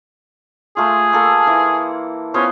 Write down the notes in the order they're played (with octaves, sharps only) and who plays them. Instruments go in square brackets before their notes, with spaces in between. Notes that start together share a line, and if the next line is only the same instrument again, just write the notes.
[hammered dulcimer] A3 F4 [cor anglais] G#4
[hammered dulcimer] A#3 A4
E3
[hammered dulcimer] B3 F4 C5 [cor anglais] C#4